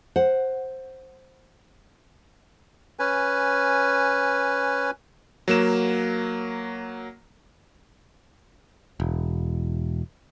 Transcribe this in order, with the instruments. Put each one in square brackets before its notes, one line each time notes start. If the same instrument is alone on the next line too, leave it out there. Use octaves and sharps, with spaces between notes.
[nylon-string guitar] C5 F#5
[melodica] C#4 B4 G#5
[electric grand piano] F#3 A#3 E7
[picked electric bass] E1